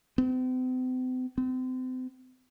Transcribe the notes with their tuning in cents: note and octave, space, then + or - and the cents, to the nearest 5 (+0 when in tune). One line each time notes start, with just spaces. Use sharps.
C4 -45
C4 -35